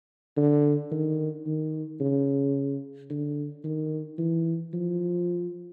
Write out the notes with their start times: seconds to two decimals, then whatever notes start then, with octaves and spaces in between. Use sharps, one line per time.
0.37 D3
0.92 D#3
1.46 D#3
2.01 C#3
3.10 D3
3.65 D#3
4.19 E3
4.74 F3